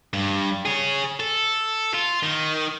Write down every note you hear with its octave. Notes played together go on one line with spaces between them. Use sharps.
G2
G#4 C#5
A4
F4
D#3